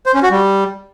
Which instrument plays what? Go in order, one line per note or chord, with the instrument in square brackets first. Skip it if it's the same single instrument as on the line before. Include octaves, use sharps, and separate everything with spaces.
[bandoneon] C5
C#4
F#4
G3